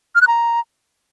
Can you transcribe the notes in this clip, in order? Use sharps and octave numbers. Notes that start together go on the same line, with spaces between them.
F6
F#6
A#5